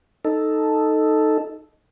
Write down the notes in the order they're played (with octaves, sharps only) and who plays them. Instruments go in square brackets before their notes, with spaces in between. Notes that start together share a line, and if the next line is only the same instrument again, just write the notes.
[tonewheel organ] D#4 A4